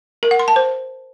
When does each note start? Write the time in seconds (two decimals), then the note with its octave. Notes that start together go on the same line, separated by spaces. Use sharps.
0.23 A#4
0.31 F#5
0.39 C6
0.48 A5
0.56 C5